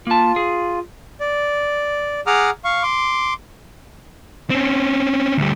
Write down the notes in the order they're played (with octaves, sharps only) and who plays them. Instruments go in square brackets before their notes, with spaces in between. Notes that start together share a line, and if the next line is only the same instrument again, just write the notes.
[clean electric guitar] A#3 A5 [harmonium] F4
[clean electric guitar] G#4
[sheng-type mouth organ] D5
G#4 F#5 A#5 D6 D#6 F6
F5 C#6
C6 D6
[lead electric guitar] C4 C#4
D2 G3